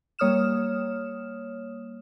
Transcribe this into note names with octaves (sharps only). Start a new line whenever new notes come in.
G3 A#3 C#5 D#6 F6 E7